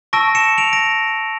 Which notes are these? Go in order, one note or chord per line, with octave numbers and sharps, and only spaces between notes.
A5 C#6 E6 A#6 D7
C#7 E7
D7 F7
A#6 D7